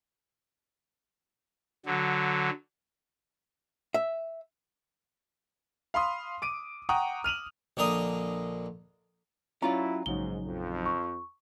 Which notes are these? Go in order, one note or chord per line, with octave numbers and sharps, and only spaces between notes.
D3 F#3
E5
F5 B5 C6 D#6
D6 D7 D#7
F#5 G5 A#5 C#6 D#6
F6 D#7 F7 F#7
A#1 D3 A#4 D#5
F#3 C#4 E4 F4 D5 A#5
A#1 G#2 C#3 F#3 D#4 G7
F2
C#6